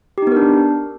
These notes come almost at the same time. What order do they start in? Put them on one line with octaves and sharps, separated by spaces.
G4 D#4 B3 A#4 D4